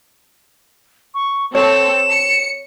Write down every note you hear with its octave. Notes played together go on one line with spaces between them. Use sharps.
C#6
C4 A4 C#5 E7
C#7